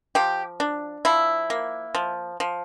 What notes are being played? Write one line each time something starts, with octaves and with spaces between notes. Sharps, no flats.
F3 G4
D4
F3 E4
A#3
F3
F3